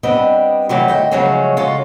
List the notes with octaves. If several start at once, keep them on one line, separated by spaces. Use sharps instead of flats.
G3 B3 C4 D4 B4 D#5
C3 D#3 E3 F#3 G3 A3
D2 D#5 G5
C#3 F3 F#3 G#3 A3 C#4
C#3 G#3 F4 F#4 A4 C#5